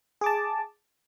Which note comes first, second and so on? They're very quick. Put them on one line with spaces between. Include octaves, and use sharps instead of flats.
G#4 D6 A5